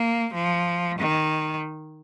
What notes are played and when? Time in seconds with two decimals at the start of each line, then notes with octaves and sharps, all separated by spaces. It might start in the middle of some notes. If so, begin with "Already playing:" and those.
Already playing: A#3
0.34 F3
0.99 D#3